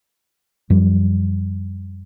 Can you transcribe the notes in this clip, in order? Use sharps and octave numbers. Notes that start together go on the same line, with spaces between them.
F#2 F3 G3